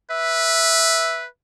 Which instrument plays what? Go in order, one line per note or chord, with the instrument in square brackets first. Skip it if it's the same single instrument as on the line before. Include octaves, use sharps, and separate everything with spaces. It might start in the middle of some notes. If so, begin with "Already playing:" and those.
[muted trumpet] B4 [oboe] E5